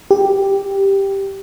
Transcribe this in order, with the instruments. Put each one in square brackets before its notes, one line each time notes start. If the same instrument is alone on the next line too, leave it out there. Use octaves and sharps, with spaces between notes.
[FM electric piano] G4